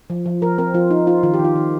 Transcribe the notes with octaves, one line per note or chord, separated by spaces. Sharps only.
F3
F3
F3 A#4
C4 A#4
F3 F4
D#4
D#4 F4
D#3 F4
G4
D#3
F4
D#3